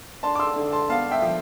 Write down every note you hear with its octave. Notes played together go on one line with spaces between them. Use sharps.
D4 A5 C6
D6
C6 E6
D3
A5 C6
B3 F5 A5
E5 G5
F3